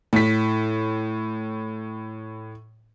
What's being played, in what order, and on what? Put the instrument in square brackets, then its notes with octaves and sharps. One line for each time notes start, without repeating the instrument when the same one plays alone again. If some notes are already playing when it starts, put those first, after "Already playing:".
[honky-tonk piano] A2 B6